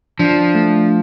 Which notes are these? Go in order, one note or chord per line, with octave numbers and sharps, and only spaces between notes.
F3 D4
A3